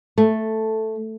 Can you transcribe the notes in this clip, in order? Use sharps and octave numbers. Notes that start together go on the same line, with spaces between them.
A3